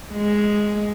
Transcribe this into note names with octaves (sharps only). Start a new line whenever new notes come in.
G#3